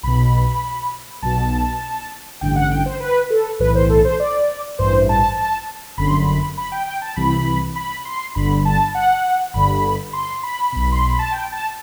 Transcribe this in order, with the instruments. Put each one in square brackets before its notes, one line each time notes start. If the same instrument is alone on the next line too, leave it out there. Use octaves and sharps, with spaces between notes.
[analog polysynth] B1 B2 B5
B1 B2 A5
A1 G2 D3 G5
F#5
G5
C5
B4
A4
B1 A2 E3 B4
C5
A4
C5
D5
A1 G2 E3 C5
A5
A5
G1 F#2 D3 B5
C6
B5
B5
G5
G5
A5
C2 C3 E3 B5
B5
C6
G1 G2 D3 B5
A5
F#5
G1 G2 D3 B5
C6
B5
B1 B2
C6
B5
A5
G5
A5